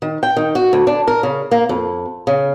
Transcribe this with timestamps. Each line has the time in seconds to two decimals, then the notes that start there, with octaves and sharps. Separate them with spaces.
0.02 D#3
0.23 G5
0.36 D#3
0.55 F#4
0.73 D2
0.87 D4
1.08 A#4
1.23 C#3
1.51 A#3
1.69 F2
2.27 C#3